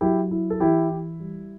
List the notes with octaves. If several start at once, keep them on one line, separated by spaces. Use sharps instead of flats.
F#3 E4 G4
E4
A4
E3 E4 G4
E4
G3